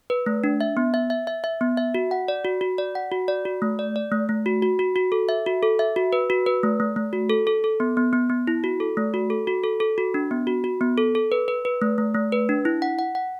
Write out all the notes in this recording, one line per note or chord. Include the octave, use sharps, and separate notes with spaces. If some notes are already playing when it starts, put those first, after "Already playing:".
B4
A3
D4
E5
B3
E5
E5
E5
E5
B3
E5
F#4
F#5
D5
F#4
F#4
D5
F#5
F#4
D5
F#4
A3
D5
D5
A3
A3
F#4
F#4
F#4
F#4
A4
E5
F#4
A4
E5
F#4
B4
F#4
B4
A3
A3
A3
F#4
A4
A4
A4
B3
B3
B3
B3
E4
F#4
A4
A3
F#4
A4
F#4
A4
A4
F#4
D4
B3
F#4
F#4
B3
A4
A4
B4
B4
B4
A3
A3
A3
B4
D4
E4
F#5
F#5
F#5